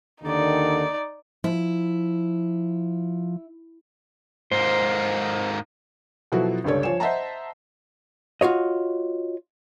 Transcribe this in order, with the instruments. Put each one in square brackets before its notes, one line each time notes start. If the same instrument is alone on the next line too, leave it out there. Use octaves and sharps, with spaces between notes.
[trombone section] D#2 D3 D#3 [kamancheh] D#4 D5
[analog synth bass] F3 [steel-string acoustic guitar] E4
[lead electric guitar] G#2 A#3 [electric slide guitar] C5
[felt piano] B2 F3 F#3 E4 F#4 A4
G1 C#2 G3 A4 C#5
F3 C#5 G#5 E7
C5 D#5 E5 F#5 A5 A#5
[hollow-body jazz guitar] F4 F#4 C#5 D#5